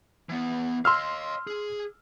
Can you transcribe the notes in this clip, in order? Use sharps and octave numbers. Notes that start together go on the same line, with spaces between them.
E3 B3
D#5 F5 C6 E6 F6
G#4